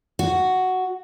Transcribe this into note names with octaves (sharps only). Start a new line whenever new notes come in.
F#4